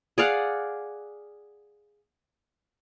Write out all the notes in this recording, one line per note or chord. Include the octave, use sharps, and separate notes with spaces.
G#4 D5 F5 F#5